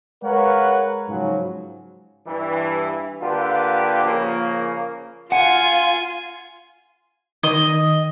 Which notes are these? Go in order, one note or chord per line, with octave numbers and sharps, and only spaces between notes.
G#3 A#4 B4 C#5 F5 F#5
G#2 C#3 F3 F#3
G2 E3
D3 A#3 F4 G4 B4
C#3 F3 A#3
F4 F#5 G#5
D#3 D#5